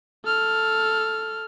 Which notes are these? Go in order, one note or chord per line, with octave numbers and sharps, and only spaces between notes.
A4 F6